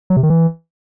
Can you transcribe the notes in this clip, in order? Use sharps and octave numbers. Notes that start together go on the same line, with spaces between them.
F#3
C3
D#3
E3